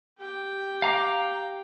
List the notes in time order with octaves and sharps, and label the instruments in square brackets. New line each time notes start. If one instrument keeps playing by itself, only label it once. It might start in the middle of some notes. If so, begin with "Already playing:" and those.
[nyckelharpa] G4 G5
[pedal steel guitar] F5 A#5 D6